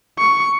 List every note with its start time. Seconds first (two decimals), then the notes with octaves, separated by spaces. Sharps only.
0.19 C#6